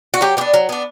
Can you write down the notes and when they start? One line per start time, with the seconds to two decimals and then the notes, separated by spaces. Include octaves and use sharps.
0.14 F#4
0.21 F#3 G4
0.37 B3 G4
0.41 D4
0.54 F#3
0.69 B3 D4